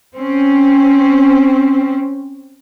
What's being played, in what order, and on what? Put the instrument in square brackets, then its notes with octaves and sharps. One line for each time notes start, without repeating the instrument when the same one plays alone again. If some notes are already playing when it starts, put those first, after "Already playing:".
[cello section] C4 C#4